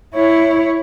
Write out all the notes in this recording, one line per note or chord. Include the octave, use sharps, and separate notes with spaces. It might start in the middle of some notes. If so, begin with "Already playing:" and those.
E4 C#5